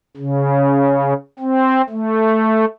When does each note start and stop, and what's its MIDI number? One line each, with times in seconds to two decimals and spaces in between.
0.17 1.13 49
1.39 1.81 60
1.89 2.65 57